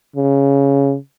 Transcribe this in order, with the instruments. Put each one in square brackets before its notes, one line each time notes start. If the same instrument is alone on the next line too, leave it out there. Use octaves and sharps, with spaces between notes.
[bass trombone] C#3